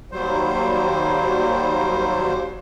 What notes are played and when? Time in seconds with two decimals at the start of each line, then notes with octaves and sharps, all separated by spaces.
0.12 D#2 F#3 G3 C5